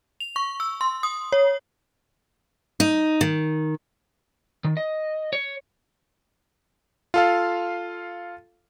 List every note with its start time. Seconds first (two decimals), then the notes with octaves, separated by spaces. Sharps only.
0.20 F7
0.36 C#6
0.60 E6
0.81 C6
1.03 D#6
1.33 C#5
2.80 D#4
3.21 D#3
4.64 D#3
4.77 D#5
5.33 C#5
7.14 F4 A4 F5